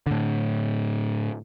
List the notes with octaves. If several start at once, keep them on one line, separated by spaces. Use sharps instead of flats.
A2 D3